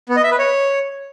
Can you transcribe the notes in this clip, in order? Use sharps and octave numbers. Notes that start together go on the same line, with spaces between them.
B3
D#5
E5
B4
C#5